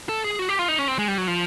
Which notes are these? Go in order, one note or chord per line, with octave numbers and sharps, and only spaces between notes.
A4
G#4
F#4
G4
F4
D#4
C#4
C4
G#3
G3
F#3
F3